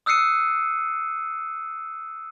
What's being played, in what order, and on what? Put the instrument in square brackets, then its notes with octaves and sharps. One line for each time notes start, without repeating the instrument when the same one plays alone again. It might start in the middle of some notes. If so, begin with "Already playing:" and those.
[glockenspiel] D#6 E6 F#6 C7 C#7 D#7